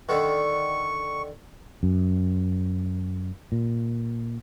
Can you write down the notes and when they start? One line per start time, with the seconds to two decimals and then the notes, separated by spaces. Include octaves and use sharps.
0.09 D3 D#3 C#6
1.83 F#2
3.52 A#2